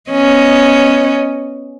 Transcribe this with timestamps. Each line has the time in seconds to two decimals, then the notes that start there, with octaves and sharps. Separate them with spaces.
0.11 B3 C#4 D#5